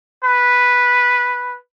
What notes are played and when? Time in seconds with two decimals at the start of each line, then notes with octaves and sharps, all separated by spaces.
0.25 B4